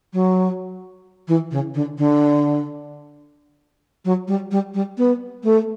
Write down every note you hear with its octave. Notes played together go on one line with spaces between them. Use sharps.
F#3
E3
C#3
D3
D3
F#3
G3
G3
G3
B3
A3